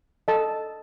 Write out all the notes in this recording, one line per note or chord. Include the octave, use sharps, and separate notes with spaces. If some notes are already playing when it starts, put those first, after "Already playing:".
A4 D#5 A5